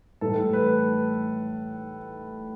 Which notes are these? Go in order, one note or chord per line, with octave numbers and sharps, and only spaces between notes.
A2 E3 G3 A4
B4